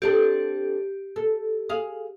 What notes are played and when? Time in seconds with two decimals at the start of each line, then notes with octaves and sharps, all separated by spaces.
0.02 C4 D4 G4 A4
1.16 A4
1.69 G#4 F5